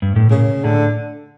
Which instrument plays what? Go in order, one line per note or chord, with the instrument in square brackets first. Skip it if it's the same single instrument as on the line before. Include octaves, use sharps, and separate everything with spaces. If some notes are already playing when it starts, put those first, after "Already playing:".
[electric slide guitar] G2
A2
[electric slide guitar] A#2 [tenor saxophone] C#3
[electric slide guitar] A2 [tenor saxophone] D3